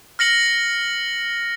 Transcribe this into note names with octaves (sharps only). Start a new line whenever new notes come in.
F6 A#6 C#7 F#7